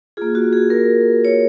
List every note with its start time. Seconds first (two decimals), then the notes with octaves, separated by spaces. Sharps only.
0.17 A#3 F4 G#4
0.35 F#4
0.53 G#4
0.70 A#4
1.25 C#5